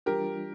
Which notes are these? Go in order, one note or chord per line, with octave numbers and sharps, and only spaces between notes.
E3 G3 D4 F4 G4 A#4